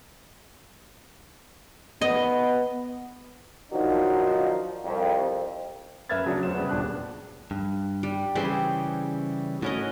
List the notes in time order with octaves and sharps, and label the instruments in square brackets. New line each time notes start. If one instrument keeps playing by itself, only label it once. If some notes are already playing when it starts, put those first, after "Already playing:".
[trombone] B3 [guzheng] D#5
[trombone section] D#3 F3 F#3 D4 D#4 F#4
C2 F2
[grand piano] F#2 B4 E5 F6 G#6 A6
C#3 F#3 B3 D4
F1 C5 E7
C#3 G3 B3
D#1 D4 F#6
[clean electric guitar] G2
[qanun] G3
[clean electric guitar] C#3 E3 G3 [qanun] G4 G#4 C5
[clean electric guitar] A2 C#4 [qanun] F#4 A#4 D#5